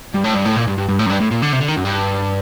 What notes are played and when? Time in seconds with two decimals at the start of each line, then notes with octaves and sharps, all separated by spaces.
0.15 G2
0.25 A2
0.35 G2
0.45 A2
0.56 A#2
0.67 G2
0.78 G2
0.89 G2
0.99 A2
1.06 F#2
1.10 G2
1.20 A2
1.31 A#2
1.42 D3
1.53 C3
1.60 D3
1.68 D#3
1.77 F#2
1.85 G2